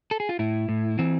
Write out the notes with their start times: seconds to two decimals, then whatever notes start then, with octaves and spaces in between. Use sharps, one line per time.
0.11 A4
0.20 G#4
0.29 F4
0.39 A2 E4
0.69 A2
0.99 E3 C4